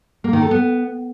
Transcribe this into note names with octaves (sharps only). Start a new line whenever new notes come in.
A#3
D#3
A4
B3